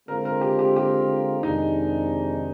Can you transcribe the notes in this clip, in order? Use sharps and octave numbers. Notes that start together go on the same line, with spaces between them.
D3 G#3 C4 F4 A#4
A#4
G4
G4
G4
F2 C3 D#3 G#3 D4 D#4